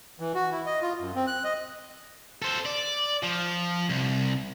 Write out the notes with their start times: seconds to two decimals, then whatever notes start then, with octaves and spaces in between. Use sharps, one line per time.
0.20 E3
0.35 F#4
0.52 E4
0.66 D#5
0.82 F4
1.00 F#2
1.15 C4
1.27 F#6
1.44 D#5
2.42 A4 C5
2.65 D5
3.23 F3
3.90 C2